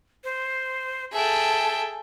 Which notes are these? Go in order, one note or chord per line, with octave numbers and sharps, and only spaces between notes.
C5
G#4 A4 E5 G5 A5